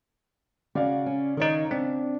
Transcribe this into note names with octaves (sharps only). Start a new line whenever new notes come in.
C#3 F#4 D5 F5
C#4
D#3 D#4 A#4 C#5
C4 D4